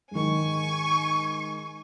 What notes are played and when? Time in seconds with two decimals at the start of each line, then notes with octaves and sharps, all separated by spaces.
0.11 G#2 D#3 G#5 C#6